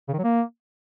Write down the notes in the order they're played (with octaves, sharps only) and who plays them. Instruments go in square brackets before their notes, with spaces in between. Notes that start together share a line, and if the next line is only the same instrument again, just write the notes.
[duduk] C#3
D#3
F#3
A#3